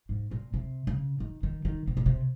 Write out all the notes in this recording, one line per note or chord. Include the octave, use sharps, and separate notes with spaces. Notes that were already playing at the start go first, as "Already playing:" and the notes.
G#2
A#2
C3
C#3
D#3
D#3
D#3
C3
A#2
C3